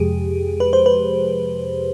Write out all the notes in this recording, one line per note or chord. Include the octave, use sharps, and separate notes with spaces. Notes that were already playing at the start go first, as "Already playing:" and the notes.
Already playing: F2 C3 F3 G#3 G4 G#4
B4
C5
B4